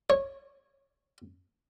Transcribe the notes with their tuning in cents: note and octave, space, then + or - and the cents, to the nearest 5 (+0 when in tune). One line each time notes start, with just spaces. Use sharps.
C#5 -15